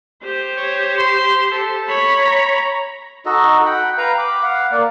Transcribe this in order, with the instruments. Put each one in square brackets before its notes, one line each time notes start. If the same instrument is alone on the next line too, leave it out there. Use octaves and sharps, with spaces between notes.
[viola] G4 C5
[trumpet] C#5
C6
A4
[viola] C#5 B5
[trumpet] A#5
[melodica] D#4 F#4 A4 D#5
F#5 G5 B5
B4 F5 G5 A#5
B5 D6
F5 F#5
A#3 D5